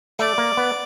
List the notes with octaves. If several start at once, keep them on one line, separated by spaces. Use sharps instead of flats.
A3 D5
A#3
B3